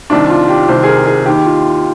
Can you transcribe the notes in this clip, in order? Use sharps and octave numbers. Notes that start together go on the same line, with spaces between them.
C2 C3 D#3 D4
F4
G4
C2 C3 D#3 C5
G#4
A#4
G#4
D#2 D#3 G4
F4